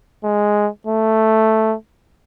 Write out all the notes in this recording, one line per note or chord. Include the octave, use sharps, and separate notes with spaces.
G#3
A3